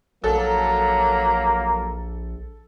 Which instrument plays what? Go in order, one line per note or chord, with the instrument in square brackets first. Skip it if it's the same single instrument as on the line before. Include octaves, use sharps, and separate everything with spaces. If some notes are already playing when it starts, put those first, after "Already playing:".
[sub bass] A#1 [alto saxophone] F#3 [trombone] A#3 [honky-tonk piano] A4